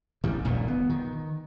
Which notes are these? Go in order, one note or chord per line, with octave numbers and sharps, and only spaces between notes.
A1 D#3 G3
D#1 A#1 A#2 D#3
B3
D#3